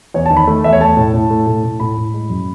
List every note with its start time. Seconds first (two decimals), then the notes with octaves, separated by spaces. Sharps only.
0.14 E2 C#5
0.26 D#3 A5
0.37 B5
0.47 A3
0.64 E2 E5
0.73 C#5
0.80 A3 A5
0.97 A2
1.14 A2
1.30 A3
1.47 A2
1.64 A2
1.80 A2 B5
1.97 A2
2.14 G#3
2.30 F#2